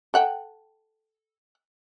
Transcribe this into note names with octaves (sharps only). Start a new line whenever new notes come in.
A4 F#5 G5